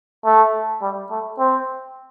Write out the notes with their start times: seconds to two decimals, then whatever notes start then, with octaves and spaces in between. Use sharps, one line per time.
0.25 A3
0.82 G3
1.11 A3
1.39 C4